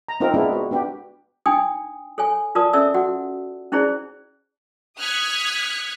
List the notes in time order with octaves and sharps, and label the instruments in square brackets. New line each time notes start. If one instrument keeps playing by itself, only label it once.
[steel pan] A#5
C4 D#4 F4 A#4
G#3 B3 C4 D4 E4 F4
F#4
B3 D4 G4
[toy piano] D4 D#4 G5 G#5 D#6
A4 C#5 G#5
F4 A#4 B4 D5 A5 D#6
C#4 A4 D5 E5 E6
F#4 F#5
C#4 D#4 E4 G#4 C5 D5
[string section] D#6 F6 F#6 G#6 B6 C#7